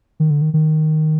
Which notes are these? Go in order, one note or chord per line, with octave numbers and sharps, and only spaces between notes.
D#3
D3
D#3
D#3